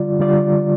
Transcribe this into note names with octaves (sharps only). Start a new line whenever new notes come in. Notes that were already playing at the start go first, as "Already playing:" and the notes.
Already playing: D3 G3 F4 D5
D3 G3 F4 D5